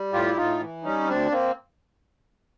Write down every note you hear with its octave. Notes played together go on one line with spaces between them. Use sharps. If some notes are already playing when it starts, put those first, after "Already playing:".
Already playing: G3
A2 F4 G4
E4
A2 D#4 F4
E3
G3 C#4 D#4
D2 C4 D4
A#3 C4